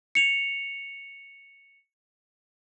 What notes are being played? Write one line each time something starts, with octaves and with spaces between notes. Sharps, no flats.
C#7 F7